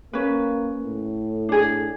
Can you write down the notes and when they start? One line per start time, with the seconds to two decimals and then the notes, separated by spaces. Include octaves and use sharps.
0.13 A#3 C#4 B4
0.83 A2
1.49 D4 G#4